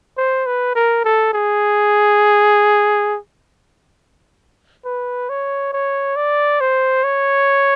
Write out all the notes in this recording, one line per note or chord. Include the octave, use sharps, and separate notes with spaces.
C5
B4
A#4
A4
G#4
B4
C#5
C#5
D5
C5
C#5